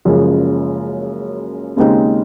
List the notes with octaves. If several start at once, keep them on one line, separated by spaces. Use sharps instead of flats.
F#1 F#2 C#3 F3 G#3
D#2 C#3 G#3 C4 D#4